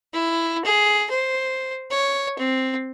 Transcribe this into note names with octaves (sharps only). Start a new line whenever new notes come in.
E4
G#4
C5
C#5
C4